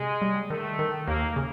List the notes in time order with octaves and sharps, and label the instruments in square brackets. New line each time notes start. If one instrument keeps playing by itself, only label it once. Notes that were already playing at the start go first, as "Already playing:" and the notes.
Already playing: [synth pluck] C3 [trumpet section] G#3
[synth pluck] G3
[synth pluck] D#3 [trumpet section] A3
[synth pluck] D#3
[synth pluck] D#2 [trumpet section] A#3
[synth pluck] C#3